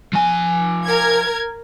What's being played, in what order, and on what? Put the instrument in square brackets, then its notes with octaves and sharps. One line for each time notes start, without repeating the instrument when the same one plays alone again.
[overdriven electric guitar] F3 G#5
[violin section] A#4 G#6